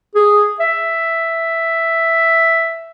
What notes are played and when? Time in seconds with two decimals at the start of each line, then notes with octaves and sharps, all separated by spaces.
0.15 G#4
0.60 E5